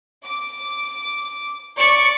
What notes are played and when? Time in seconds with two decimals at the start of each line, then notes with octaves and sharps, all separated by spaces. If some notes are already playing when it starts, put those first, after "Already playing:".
0.25 D6
1.77 D5 C#6